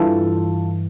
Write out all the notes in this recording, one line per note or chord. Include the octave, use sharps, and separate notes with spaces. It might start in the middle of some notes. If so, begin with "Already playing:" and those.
Already playing: G2 E3 F4 A4